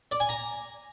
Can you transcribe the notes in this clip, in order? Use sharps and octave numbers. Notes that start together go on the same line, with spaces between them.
D5
G#5
A#5